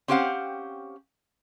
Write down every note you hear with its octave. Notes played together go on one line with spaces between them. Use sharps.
C4 C#4 G4 C5 F5 F#5